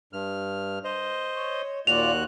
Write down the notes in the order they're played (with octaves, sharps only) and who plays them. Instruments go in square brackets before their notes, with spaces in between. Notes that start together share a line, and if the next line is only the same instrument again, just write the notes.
[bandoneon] G2 F6
C5 D#5
[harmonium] C#5
[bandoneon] D#2 F#4 F#6 [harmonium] A#2 F4 D5 [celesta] F7